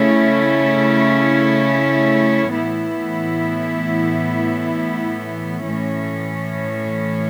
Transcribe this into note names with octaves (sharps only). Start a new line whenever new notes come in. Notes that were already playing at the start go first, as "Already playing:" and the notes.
Already playing: C#3 A3 C#4 E4
A2 E3 B3 E4
A2 E3 C#4